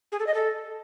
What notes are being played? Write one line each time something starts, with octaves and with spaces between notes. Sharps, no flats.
G#4
A4
D#5
A4